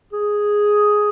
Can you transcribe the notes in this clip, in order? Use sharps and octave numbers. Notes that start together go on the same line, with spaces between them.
G#4